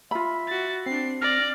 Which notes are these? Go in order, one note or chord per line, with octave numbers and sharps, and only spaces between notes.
F4 E5 B5
F#4 A6
C4 D4 C7
D5 F6 A#6